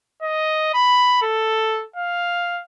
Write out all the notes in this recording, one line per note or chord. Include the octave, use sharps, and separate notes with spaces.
D#5
B5
A4
F5